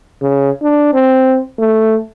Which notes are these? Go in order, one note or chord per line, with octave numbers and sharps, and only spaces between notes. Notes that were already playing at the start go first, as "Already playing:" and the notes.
C#3
D4
C4
A3